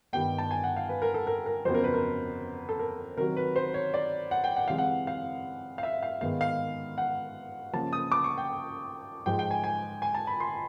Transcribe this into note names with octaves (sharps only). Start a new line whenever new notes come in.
G2 D#3 G3 B3 G5
A5
G#5
F#5
F5
B4
A#4
A4
A#4
A#4
F2 C#3 F#3 B3 C5
A#4
B4
A#4
A4
A#4
C3 D#3 F#3 A#4
B4
C5
C#5
D5
F#5
G5
F#5
C3 E3 G#3 F5
F#5
F5
F5
E5
F5
G#2 D#3 G#3 B3 F5
F5
F#5
C#3 F3 A#3 A5
D#6
D6
C#6
G5
G#2 F3 G#3 G5
G5
G#5
G#5
G#5
A5
B5
C6